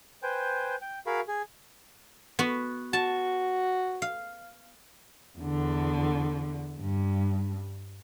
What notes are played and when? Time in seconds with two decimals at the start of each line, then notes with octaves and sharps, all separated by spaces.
0.23 B4 C5 G5 G#5
0.82 G5
1.06 F#4 G#4 A#4 F5 B5
1.28 G#4
2.39 B3 F#4
2.93 F#4 A5
4.02 F5
5.38 E2 D3
6.80 G2